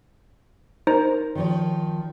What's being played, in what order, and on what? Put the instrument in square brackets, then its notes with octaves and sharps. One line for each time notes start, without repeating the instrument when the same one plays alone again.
[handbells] D#4 C5 A#5 [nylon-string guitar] A#4
[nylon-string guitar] D#3 F3 C#5